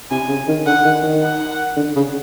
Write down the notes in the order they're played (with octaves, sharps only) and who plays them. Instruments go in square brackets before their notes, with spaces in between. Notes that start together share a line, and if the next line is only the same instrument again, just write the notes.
[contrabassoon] C3 [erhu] G#5
[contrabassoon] C#3
D#3
[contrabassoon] D3 [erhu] F#5
[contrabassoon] D#3
D#3
[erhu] F#5
[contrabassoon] D3
C#3